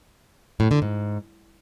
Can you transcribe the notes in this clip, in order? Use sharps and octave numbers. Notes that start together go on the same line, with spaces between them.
A2
D3
G#2